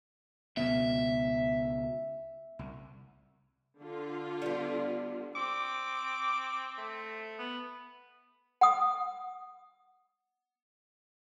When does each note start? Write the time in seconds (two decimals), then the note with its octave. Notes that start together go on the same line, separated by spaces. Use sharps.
0.57 C#2 B2 B3 E5
2.59 C2
3.81 D3 F4
4.42 G3 B3
5.35 C4 D6
6.78 A3
7.39 B3
8.61 F#5 D#6